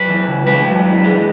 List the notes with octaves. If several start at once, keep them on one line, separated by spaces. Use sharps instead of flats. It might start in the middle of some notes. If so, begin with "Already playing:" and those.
Already playing: F#2 B4
E3
C#3
G#3 B4
F#2
E3
G#3